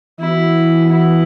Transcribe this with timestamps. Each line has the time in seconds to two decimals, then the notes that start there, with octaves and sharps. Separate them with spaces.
0.19 E3 B3 E4 F#4
0.90 E4